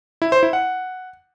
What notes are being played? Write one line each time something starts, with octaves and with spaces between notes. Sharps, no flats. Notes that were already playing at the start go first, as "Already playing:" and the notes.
E4
C5
E4
F#5